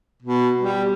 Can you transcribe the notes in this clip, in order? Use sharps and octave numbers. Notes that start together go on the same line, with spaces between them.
B2
G3